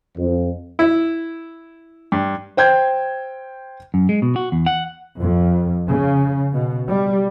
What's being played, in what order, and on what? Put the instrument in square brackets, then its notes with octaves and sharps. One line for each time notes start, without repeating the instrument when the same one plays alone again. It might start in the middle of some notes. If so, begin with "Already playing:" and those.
[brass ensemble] F2
[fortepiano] E4
G2
[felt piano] C5 G5 G6 G#6
[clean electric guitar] F#2
G#3
B2
F#4
E2
F#5
[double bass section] F2
C#3
B2
G3